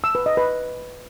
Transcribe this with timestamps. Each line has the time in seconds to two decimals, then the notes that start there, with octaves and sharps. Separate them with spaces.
0.04 E6
0.15 B4
0.26 D#5
0.37 B4